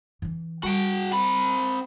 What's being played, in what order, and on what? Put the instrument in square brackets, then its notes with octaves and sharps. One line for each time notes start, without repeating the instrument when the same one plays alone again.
[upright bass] E3 D4
[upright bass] G3 [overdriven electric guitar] F#4 G5
[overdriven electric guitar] C4 B5